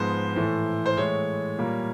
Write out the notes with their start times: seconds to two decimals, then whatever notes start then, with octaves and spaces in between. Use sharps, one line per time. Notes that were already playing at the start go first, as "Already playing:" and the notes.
Already playing: G#2 F3 G#3 B3 C5
0.36 A2 E3 A3
0.86 C5
0.97 A2 E3 G#3 C#5
1.58 A#2 G3 A#3